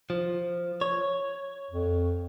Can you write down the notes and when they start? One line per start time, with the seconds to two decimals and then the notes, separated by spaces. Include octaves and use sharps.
0.10 F3
0.81 C#5
1.71 F2